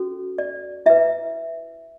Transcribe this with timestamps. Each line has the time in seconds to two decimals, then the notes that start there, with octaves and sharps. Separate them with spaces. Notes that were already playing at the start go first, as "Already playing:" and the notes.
Already playing: C#4 F#4 A4
0.38 D5
0.86 E4 B4 E5